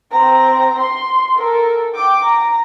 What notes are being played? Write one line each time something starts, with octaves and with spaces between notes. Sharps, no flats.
C4 A#5
C6
A4 A#4
G5 D6
A#5